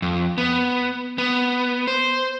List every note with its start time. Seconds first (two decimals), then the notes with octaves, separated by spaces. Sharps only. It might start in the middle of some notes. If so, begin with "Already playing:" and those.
0.02 F2
0.38 B3
1.18 B3
1.87 C5